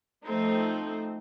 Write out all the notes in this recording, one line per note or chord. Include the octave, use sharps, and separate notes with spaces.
F3 A3 C4 D#4 C5